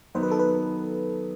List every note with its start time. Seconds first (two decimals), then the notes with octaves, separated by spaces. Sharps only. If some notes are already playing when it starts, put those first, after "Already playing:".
0.15 D#3 F#3 B3 D#4 C5
0.23 B4
0.31 A4
0.39 B4